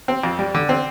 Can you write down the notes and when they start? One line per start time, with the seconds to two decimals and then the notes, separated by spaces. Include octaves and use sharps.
0.08 C4
0.23 F2
0.39 G3
0.55 D3
0.69 C4